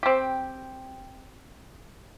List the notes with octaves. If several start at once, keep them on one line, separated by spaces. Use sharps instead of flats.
C4 G4